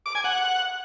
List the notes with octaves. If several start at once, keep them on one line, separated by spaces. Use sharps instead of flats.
D6
G#5
F#5